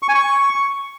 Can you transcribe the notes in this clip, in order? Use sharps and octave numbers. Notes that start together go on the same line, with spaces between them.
C#6
G#5
C#6